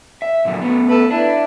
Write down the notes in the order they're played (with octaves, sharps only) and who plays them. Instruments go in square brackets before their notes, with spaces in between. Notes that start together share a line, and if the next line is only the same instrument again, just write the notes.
[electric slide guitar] E5
A#2 D3 F#3
A3 B3
[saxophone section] A4 B4
[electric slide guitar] D4 [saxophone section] E4 B4